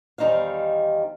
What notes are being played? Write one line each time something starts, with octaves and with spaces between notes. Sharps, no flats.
E2 D#3 G3 D#4 C5 F5